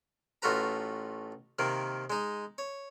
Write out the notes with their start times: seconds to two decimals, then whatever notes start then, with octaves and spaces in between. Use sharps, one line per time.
0.42 A1 A3 F4 F#4 B4 A#5
1.59 C3 D#3 A#3
2.10 G#3 D#4
2.58 C#5